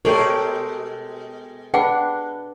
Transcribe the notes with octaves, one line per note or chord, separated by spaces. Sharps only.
B2 G#3 G4 A4 A#4 C#5 D5 C6
D4 G#4 B4 F#5 G5